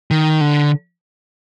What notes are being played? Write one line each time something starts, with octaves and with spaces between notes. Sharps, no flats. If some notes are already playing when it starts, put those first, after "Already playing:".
D#3
D3